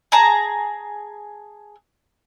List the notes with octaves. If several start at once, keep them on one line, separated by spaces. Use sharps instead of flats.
G#4 A5 A#5